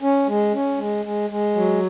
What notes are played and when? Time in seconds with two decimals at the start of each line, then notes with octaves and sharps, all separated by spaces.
0.02 C#4
0.27 G#3
0.54 C#4
0.78 G#3
1.05 G#3
1.30 G#3
1.56 F#3